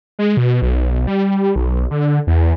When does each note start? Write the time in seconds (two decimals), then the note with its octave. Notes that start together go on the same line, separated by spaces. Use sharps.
0.19 G#3
0.37 B2
0.62 B1
1.07 G3
1.56 B1
1.91 D3
2.27 E2